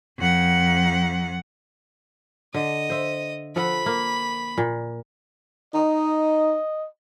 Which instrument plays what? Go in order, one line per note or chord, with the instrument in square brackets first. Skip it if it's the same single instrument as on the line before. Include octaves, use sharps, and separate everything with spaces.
[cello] F2 F#5
[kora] D3 [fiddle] D#5
[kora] C5 E5
[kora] F3 A4 F#5 [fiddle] B5
[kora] A#3
A#2
[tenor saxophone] D#4 [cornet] D#5